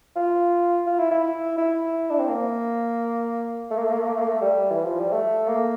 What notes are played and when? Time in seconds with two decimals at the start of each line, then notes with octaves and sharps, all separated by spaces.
0.16 F4
0.87 F4
0.99 E4
1.11 E4
1.58 E4
2.10 D4
2.19 C4
2.29 A#3
3.71 A3
3.78 A#3
3.85 A3
3.92 A#3
4.00 A3
4.07 A#3
4.14 A3
4.21 A#3
4.28 A3
4.42 G3
4.71 E3
4.85 F3
4.99 G3
5.13 A3
5.48 A#3